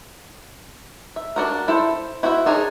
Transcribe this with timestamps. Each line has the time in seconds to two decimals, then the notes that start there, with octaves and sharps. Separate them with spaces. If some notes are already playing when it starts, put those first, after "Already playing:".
1.16 E5
1.36 D4 F#4 A#4
1.68 E4 A4 C5
2.23 E4 F#4 C5 D5 E5
2.46 D4 D#4 G#4 A#4 C#5